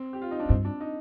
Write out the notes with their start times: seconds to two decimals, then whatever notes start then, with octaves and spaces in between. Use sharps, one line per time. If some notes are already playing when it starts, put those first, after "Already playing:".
Already playing: C4
0.13 G4
0.22 F4
0.31 D#4
0.40 D4
0.49 G2 C4
0.65 D4
0.80 D#4